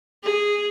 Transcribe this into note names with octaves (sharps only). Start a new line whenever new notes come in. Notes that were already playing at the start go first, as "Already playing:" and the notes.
G#4